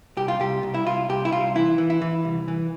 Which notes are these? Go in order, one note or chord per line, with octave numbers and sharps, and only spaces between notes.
C2 G4
F4
C2 G4
C2
E4
C2 F4
C2 G4
E4
C2 F4
E3 E4
E3
E4
E3
C2
E3